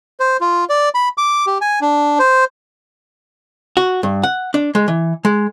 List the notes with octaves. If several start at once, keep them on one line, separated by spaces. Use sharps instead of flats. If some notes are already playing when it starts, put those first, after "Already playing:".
C5
F4
D5
B5
D6
G4
G#5
D4
C5
F#4
G2
F#5
D4
G#3
E3
G#3